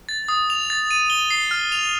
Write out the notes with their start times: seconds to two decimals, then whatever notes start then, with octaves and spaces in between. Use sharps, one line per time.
0.09 A6
0.28 D#6
0.50 F7
0.70 A6
0.91 D#7
1.10 G7
1.30 C7
1.51 F6
1.72 F7